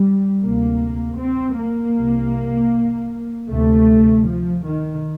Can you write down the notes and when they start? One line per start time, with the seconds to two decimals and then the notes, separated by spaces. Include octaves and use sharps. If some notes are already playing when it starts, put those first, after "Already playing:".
Already playing: G3
0.43 D2 C3 A#3
1.20 C4
1.58 A#3
1.97 C2 C3
3.50 D2 C3 A3
4.28 F3
4.66 D#3